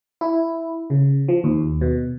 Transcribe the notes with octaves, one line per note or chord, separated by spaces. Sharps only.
E4
C#3
F3
D#2
B2